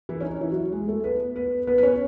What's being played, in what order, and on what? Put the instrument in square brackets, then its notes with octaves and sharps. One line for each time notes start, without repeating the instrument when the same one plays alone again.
[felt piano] E3 E4
C#4
D#4
E3 E4
F#3 F#4
G#3 G#4
A3 A4
B3 B4
B3 B4
B3 B4
B4
C#4 C#5